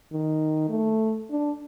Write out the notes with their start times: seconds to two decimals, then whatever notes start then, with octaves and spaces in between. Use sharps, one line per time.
0.12 D#3
0.69 A3
1.31 D4